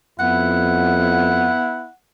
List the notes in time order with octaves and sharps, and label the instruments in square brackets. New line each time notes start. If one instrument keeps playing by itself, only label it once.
[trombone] F2 [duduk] B3 [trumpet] E4 [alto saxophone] F#5